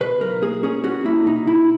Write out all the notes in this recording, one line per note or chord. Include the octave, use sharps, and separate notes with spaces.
B2 B4
B1 A#4
A#3 G#4
C#4 G#4
C#4 F#4
A#3 E4
B2 D#4
B2 E4